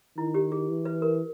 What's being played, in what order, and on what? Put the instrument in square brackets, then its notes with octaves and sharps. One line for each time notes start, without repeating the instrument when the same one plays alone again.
[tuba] D#3 [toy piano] E4
[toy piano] G4
G#4
[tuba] E3
[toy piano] B4
A#4